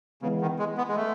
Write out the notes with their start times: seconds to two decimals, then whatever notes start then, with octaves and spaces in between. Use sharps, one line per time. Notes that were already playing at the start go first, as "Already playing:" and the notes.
0.22 C#3 E3 G#3 B3
0.41 D#3
0.59 G#3
0.78 B3
0.88 G#3
0.96 A3